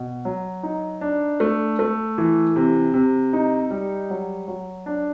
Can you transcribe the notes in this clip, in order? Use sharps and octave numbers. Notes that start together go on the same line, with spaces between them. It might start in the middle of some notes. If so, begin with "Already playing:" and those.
Already playing: B2
F#3
D#4
D4
A3
A3
E3
C3
C3
D#4
G3
F#3
F#3
D4